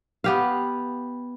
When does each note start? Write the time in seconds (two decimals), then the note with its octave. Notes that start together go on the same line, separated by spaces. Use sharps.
0.24 B3 G4 F5